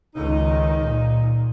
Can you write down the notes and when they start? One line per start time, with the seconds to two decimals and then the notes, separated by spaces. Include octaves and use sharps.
0.15 C#2 D#3 D#4
0.84 A#2